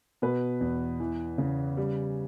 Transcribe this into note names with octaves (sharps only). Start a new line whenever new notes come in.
B2 B4
E2
E3
C#3
G3